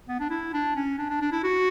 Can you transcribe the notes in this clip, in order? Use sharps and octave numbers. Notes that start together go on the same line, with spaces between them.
B3
D4
E4
D4
C#4
D4
D4
D4
E4
F#4